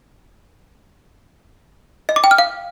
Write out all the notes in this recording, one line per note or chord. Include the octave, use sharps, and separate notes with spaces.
D#5
D6
G5
F6
F5